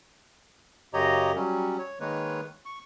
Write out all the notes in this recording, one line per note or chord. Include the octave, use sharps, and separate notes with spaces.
F#2 C#3 G4 C#5 D#5 A#5
F#3 G3 C#4
C#5
D#3 G#3 A#3 B4 C#5
C#6